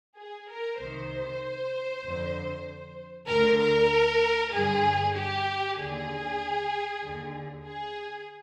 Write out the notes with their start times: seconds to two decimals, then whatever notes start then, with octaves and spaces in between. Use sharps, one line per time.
0.17 G#4
0.49 A#4
0.80 C2 C3 D#3 C5
2.04 F2 D3
3.28 D2 A#4
3.33 D3
3.59 A#4
4.53 G2 D3 G#4
5.15 G4
5.77 D#2 D3 G#4
7.02 D#2 D3
7.65 G#4